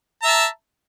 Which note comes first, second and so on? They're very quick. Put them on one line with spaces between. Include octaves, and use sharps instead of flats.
A#5 E5 A5